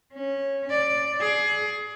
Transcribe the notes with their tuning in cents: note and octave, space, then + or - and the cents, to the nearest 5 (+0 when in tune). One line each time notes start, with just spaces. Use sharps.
C#4 -15
D5 +5
G#4 +20